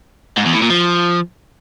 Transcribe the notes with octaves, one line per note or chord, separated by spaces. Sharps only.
G#2
E2
A2
A#2
F3